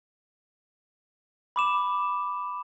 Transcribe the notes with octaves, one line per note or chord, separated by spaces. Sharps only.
B5 D6 E7